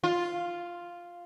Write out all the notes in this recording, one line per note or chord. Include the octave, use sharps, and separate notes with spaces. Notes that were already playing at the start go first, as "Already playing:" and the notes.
F4